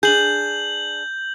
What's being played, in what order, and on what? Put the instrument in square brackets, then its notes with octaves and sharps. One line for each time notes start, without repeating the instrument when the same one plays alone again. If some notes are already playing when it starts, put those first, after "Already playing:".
[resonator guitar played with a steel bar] D4 G#4 [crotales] G6 F#7